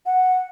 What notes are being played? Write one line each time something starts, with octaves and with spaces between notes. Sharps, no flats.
F#5